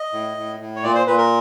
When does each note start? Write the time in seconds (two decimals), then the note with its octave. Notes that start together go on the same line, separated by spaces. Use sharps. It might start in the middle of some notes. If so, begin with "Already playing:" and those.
Already playing: D#5
0.13 A2
0.37 A2
0.60 A2
0.76 C#5
0.83 A#2 D5
0.95 C5
1.07 A#2 B4
1.18 A#4